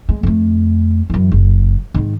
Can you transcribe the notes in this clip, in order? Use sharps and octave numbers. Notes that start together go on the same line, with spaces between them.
G#3
F2 A3
F#2 E3
F#1
G#2 D#3